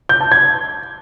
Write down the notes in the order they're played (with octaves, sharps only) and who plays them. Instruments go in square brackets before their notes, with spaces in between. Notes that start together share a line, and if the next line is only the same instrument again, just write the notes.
[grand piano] G6
A5
G#6